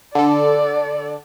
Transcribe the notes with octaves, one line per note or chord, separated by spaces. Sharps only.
D3 A4 D5